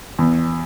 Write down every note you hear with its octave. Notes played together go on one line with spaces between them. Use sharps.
E2